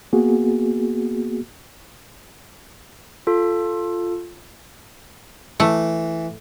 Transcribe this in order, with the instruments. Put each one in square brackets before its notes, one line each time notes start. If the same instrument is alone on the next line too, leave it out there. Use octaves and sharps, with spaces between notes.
[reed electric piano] A#3 B3 F#4 G#4
[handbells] F4 A4
[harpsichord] E3 [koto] A3